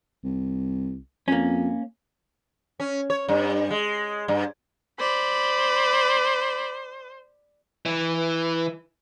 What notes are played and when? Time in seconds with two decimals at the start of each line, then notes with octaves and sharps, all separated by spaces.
0.24 C2
1.28 F2 A#3 C#4
2.80 C#4
3.10 C#5
3.28 G2
3.71 G#3
4.28 G2
4.99 C5 D5 B5
7.86 E3